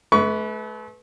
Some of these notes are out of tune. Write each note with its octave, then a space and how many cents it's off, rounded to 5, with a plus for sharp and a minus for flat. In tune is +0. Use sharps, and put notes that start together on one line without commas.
A3 -35 B4 +0 C#6 +30